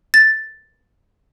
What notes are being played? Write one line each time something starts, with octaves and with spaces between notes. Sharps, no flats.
A6